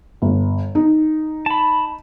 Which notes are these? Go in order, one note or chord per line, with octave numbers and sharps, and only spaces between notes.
G1
D#4
A5 B5